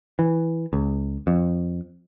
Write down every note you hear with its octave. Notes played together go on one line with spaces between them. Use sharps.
E3
C#2
F2